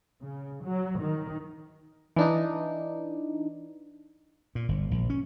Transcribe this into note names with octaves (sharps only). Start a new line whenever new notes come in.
C#3
F#3
D#3
E3 D4 D#4
A#2
G1
A#1
C#4